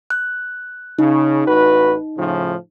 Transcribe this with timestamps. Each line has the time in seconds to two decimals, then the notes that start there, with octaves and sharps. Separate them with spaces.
0.10 F#6
0.99 C#3 D#4
1.47 A1 F#4 B4
2.17 A2 C#3 F3